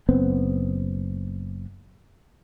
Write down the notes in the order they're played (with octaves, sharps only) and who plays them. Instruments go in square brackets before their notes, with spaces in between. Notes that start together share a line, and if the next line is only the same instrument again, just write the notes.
[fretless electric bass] F#1 B3 C4